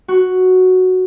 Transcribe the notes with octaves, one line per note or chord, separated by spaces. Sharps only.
F#4